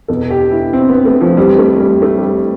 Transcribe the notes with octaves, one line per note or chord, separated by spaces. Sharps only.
E2 B2 A4
G4
E4
C4
B3
A3
F3
F2 E3 G3
A3
G3
A3
G3